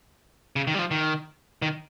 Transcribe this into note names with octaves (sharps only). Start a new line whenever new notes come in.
C#3
D#3
G3
F3
D#3
D#3